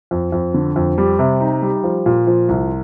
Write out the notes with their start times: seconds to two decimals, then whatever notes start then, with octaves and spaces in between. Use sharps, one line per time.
0.11 F2
0.32 F2
0.54 D3
0.76 F2
0.98 G3
1.19 C3
1.40 D#4
1.62 G3
1.84 F3
2.06 A#2
2.27 F3
2.49 C2